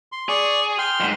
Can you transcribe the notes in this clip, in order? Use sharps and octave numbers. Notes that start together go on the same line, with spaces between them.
C6
G#4 D5 C#6 D#6
G5 C6 F6
F2 G#2